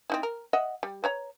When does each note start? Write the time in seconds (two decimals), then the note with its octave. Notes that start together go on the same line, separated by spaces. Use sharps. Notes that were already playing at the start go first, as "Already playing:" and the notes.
0.10 C4 D#4 E4
0.23 A#4
0.53 D#5 E5 F#5
0.83 G3
1.04 B4 C#5 A#5